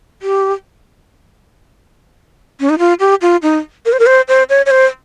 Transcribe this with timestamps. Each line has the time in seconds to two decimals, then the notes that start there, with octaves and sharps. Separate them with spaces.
0.22 G4
2.60 C#4
2.70 D#4
2.79 F4
3.00 G4
3.22 F4
3.43 D#4
3.86 A#4
3.93 C5
3.99 A#4
4.06 C5
4.28 C5
4.50 C#5
4.66 C#5
4.71 C5